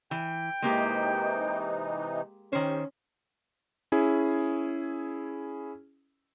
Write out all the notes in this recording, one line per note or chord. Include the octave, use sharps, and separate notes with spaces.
E3 G5
C3 E3 G#3 A#3 D#4 G4
D#3 C#4 G4 C5
C#4 E4 G#4